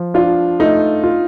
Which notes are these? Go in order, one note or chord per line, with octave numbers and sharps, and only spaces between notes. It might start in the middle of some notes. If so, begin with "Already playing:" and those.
Already playing: F3
D4 F4
A3 D#4
F4